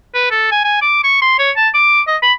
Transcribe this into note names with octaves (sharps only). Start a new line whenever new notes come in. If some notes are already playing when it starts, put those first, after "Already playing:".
B4
A4
G#5
G#5
D6
C#6
C6
C#5
A5
D6
D#5
B5